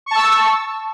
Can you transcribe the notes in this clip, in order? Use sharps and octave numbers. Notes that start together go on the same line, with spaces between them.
A5 C#6 E6